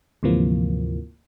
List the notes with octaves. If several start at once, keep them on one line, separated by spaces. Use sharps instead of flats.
D2 G#2 C3 E3 F3 A#3